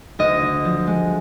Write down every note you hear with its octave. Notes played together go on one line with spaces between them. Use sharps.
D2 D#5
D3
F3
G#3